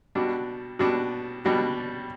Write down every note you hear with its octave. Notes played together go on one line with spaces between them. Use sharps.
B2 G3 D4 F#4
B2 G3 D4 F#4
B2 G3 D4 F#4